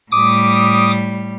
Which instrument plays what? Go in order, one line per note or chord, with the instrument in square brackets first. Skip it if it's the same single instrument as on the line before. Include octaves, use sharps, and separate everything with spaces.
[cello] A2 G3 [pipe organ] D6 D#6